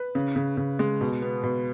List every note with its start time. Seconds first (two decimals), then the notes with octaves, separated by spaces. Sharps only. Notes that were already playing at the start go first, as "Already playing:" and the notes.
Already playing: B4
0.15 C#3
0.36 C#3
0.57 C#3
0.79 G#3
1.01 B2
1.22 B3
1.43 B2